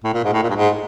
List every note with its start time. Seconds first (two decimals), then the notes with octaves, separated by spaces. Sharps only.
0.04 A2
0.13 A#2
0.24 G#2
0.33 A2
0.43 A#2
0.50 G2
0.56 G#2